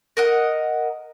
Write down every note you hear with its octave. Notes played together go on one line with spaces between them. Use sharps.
A#4 D#5 F#5